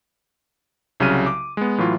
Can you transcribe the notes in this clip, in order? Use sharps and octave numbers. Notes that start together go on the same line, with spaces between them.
C2 C#3 F#3 F6 D#7
D6
G#3 B3
A2 E3 F#3 F4